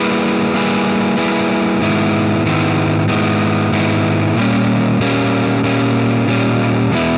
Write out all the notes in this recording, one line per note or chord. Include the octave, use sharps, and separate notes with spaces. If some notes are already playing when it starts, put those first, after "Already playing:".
Already playing: G3 A#3 E4 G#4 B4
G3 A#3 E4 G#4 B4
G3 A#3 E4 G#4 B4
G#2 D#3 G#3 B3 E4
G#2 D#3 G#3 B3 E4
G#2 D#3 G#3 B3 E4
G#2 D#3 G#3 B3 E4
A#2 G3 A#3 C#4
A#2 G3 A#3 C#4
A#2 G3 A#3 C#4
A#2 G3 A#3 C#4
E2 B2 G#3 B3 E4